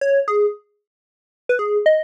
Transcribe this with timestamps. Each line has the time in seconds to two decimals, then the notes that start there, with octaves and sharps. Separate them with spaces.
0.01 C#5
0.28 G#4
1.49 B4
1.59 G#4
1.86 D#5